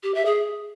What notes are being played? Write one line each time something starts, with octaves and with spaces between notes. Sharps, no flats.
G4
E5
G#4